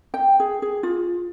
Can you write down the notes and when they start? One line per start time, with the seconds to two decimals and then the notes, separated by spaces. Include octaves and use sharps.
0.14 G5
0.40 G#4
0.62 G#4
0.83 F4